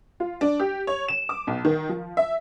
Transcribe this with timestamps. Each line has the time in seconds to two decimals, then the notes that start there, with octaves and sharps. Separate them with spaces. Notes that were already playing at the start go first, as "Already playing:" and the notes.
0.20 F4
0.41 D4
0.60 G4
0.87 C#5
1.08 E7
1.29 D6
1.47 B1
1.65 D#3
1.89 F3
2.17 E5